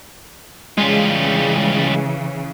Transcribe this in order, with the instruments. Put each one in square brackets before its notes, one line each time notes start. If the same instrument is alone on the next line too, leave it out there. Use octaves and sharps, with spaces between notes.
[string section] C#3 E3 [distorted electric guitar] G3 F4 [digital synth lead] G#3